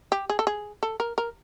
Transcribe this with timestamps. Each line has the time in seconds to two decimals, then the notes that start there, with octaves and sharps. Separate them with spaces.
0.12 G4
0.30 G#4
0.39 A4
0.47 G#4
0.83 A4
1.00 A#4
1.18 A#4